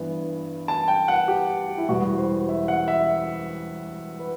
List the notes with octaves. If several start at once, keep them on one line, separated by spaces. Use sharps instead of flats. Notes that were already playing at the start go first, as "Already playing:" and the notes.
Already playing: G2 E3 B3
A5
G5
F#5
G4
E4
E1 E2 B2 G3 F#4
C5
E5
F#5
E5
B4